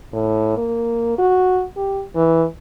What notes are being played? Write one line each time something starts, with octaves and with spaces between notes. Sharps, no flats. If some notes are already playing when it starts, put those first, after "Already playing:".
A2
A#3
F#4
G4
E3